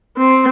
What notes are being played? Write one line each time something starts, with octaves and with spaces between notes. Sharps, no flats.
C4